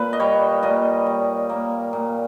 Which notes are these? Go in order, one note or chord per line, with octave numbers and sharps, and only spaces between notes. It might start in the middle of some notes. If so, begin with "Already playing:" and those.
Already playing: A#2 B4
D#5
G3 C#5
A#2 D#5
G3
A#3
A#2